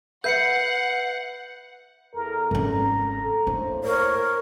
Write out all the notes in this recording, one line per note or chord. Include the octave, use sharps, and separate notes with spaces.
B4 E5 F#5 G6 C7 C#7
E2 A4 A#4
G#1 C#4 A#5
A4
A2 A#3 D4 C5
A#4 C#5